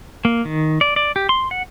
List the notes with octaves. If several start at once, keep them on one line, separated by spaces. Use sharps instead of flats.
A#3
D#3
D5
D5
G4
C6
F#5